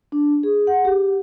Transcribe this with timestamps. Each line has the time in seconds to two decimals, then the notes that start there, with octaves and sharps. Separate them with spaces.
0.12 D4
0.43 G#4
0.67 F#5
0.85 G4